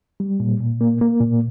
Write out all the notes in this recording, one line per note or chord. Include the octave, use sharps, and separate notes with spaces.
G3
A#2
A#2
A#3
A#3
A#2